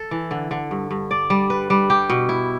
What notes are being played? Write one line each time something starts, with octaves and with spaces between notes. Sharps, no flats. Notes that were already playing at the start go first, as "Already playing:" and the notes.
Already playing: A4
E3
D3
D3
G2
G2
D5
G3
B4
G3
G4
B2
E4